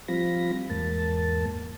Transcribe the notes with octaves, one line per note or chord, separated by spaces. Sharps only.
F3 G3 C4 F4 B5 A#6
E2 G#2 A#3 A5